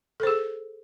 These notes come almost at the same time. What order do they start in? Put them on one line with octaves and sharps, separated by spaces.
A4 C5 G#4